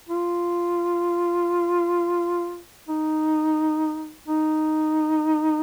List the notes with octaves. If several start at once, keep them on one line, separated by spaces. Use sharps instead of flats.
F4
D#4
D#4